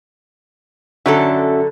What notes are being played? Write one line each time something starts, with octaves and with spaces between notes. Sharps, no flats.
D3 F#3 C#4 F#4 A4 E5